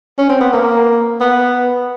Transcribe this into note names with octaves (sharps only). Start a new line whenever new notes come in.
C#4
C4
B3
A#3
B3